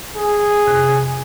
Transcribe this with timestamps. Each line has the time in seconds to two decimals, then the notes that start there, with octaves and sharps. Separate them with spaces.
0.16 G#4
0.66 F2 C3 F#6